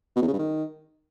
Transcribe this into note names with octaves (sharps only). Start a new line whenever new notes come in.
B2
E2
C#3
G2
D#3